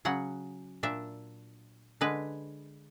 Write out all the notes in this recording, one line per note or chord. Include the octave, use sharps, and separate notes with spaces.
C#3 F#3 F#5
A#2 D4 E5
D3 G#3 B4